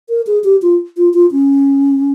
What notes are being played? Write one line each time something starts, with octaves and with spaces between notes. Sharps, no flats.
A#4
G#4
G4
F4
F4
F4
C#4